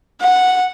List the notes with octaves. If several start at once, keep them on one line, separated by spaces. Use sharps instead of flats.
F#5